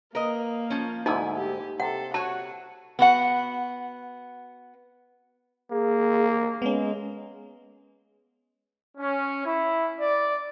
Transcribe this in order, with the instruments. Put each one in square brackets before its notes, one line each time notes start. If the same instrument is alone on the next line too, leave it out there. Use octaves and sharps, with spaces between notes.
[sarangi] A#3 [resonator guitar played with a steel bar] A#4 D#5 [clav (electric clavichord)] B4
[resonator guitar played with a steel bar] F3 C#4
[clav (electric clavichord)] D2 G#2 D3 [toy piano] D#4 [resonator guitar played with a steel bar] E4 G#5
[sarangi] G4
[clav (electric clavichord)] C3 [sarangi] A4 [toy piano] F#5
[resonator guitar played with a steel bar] F#4 C#5 [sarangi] F#5 [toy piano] A5
[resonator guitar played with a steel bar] B3 F#4 F#5
[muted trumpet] A#3 [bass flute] G#4
[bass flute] G#3 [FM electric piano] B3 C#4
[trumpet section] C#4
E4
D5